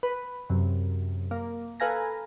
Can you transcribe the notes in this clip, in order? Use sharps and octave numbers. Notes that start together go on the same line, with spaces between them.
B4
F#2 C3
A#3
A4 B4 F5 G#5 A#5